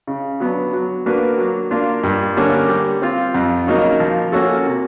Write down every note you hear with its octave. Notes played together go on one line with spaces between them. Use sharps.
C#3
F#3 B3 D4
F#3
A#3 D4 F#4 B4
F#3
A#3 D4 F4
G2
D3 G3 A#3 C#4
G3
C4 F4
F2
C#3 F#3 A#3 D#4
F3
A#3 C#4 F#4 A4
C3